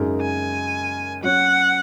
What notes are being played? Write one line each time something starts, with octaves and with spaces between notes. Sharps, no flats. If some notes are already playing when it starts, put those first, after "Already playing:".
Already playing: F#2 C#3 G#3 D#4 A#4
G#5
F#3 C#4 F#4 C#5 F#5